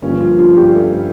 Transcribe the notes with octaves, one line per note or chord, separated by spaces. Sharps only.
G1 G2 F3 A#3 C#4
F3 F4
F3 F4
G3 G4
A3 A4